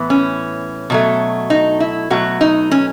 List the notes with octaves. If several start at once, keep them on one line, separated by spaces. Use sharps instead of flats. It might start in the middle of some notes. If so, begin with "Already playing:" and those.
Already playing: A2 E3 B3
C#4
B2 F#3 A3
D#4
E4
B2 F#3 A3 F#4
D#4
C#4